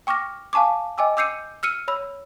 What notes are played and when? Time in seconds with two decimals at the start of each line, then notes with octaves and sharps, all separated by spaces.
0.07 G5 C#6 D6 F6 A#6
0.53 F5 G#5 A5 C#6 D6
0.98 D#5 G5 G#5 D6 E6
1.17 D6 E6 G6 C7 C#7 D#7
1.63 E6 F6 C#7 D#7
1.88 C#5 B5 E6